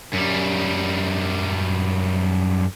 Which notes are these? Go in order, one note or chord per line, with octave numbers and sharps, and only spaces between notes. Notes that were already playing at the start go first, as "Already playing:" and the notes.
F#2 G3